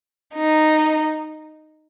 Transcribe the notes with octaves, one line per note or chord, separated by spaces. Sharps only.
D#4